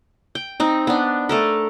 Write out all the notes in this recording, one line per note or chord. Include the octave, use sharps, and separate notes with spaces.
G5
C4 D#4
B3 D4
A3 A4 A#4